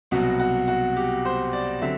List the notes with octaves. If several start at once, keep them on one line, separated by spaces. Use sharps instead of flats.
C2 B2 F#3 F#4
F#4
F#4
G4
C5
D5
D3 F#3 C4 E5